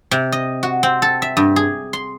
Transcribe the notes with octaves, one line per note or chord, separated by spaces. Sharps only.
C3
D#5
F#4
C4
A4
E5
G2
G#4
C6